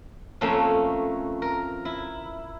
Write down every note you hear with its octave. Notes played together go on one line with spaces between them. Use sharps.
F2 A3 A#3 C#4
A#4
E4